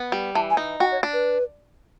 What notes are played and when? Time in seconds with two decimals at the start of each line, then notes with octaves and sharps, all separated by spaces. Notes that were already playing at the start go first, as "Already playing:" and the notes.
Already playing: B3
0.12 G3
0.35 E3 A5
0.50 G#5
0.57 D#4
0.80 F#4 G5
0.92 C#5
1.03 D4
1.13 B4